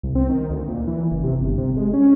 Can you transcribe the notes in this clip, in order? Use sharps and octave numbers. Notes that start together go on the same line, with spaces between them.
C2
C4
D#3
D2
A#2
E3
F#1
C3
G1
C3
G#3
C#4